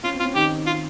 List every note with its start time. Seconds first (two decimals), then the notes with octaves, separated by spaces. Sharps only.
0.04 C#4 F4
0.14 C4
0.20 F4
0.25 C#4
0.35 D#3 D#4 G4
0.67 F4